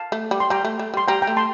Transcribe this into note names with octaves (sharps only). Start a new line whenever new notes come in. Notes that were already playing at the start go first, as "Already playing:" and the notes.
Already playing: F5 A5
A3
G3
C6
G3 G5 A#5
A3
A3
G3 C6
G3 G5 A#5
G5 A#5
A3
A5 C6